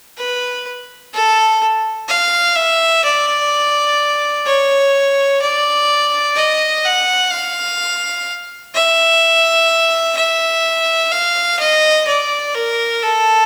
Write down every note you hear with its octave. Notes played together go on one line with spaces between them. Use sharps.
B4
A4
F5
E5
D5
C#5
D5
D#5
F#5
F5
E5
E5
F5
D#5
D5
A#4
A4